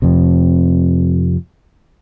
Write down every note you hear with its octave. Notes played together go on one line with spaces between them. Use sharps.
F2 C3